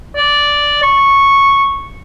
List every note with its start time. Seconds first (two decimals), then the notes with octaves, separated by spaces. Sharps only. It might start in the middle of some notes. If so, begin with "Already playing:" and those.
0.16 D5
0.83 C#6